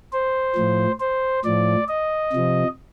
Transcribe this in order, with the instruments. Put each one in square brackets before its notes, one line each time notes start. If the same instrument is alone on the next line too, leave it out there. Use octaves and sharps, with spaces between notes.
[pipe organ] C5
A2 F3
C5
A2 F3 D5
D#5
C3 F3